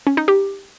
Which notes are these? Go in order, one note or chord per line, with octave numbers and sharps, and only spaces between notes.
C#4
D#4
G4